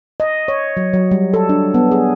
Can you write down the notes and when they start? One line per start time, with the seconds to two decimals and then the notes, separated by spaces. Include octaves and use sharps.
0.20 D#5
0.48 C#5
0.77 F#3
0.93 F#3
1.11 G3
1.34 A4
1.49 D4
1.74 B3
1.91 G#4